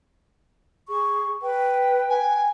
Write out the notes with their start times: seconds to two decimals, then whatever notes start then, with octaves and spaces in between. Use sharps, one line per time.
0.88 G#4 C#6
1.42 B4 G5
2.10 G#5